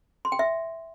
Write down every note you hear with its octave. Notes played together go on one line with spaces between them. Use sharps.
C6
G5
E5